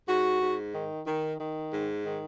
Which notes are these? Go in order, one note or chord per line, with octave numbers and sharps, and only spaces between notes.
G#2 F#4
G#2
D#3
D#3
D#3
G#2
D#3